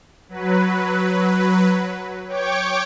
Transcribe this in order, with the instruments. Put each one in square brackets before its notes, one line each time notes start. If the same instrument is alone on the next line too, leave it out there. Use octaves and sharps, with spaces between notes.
[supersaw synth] F#3 B4
C#5 G5 C#6 D6